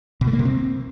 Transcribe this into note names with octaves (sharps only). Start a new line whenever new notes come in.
B2
A3
A#3
C3
C4